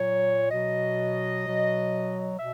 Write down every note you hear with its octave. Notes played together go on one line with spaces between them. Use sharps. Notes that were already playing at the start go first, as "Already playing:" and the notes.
Already playing: A#2 F#3 C#5
B2 F#3 D#5
B2 F#3
B2 E5